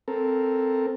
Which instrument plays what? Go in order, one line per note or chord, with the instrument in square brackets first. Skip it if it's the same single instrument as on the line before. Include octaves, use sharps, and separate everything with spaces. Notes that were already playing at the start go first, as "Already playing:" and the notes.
[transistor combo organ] C4 A4 A#4